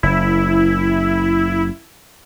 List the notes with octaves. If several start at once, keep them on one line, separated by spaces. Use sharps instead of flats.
F#1 E4